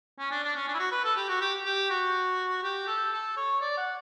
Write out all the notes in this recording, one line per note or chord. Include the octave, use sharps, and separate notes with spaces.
C#4
D4
D4
C#4
D4
E4
F#4
B4
A4
G4
F#4
G4
G4
F#4
G4
A4
A4
C#5
D5
F#5